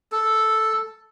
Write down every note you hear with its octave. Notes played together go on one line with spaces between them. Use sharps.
A4